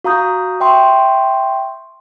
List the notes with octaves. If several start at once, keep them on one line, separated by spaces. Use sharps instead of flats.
F#4 F5 A#5 D#6 G6
E5 G5 C6 C#6